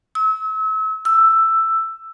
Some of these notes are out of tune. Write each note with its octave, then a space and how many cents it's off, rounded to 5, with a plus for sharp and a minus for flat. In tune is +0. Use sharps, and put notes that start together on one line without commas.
E6 -35
E6 +10